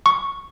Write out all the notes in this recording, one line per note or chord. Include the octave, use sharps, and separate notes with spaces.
C#6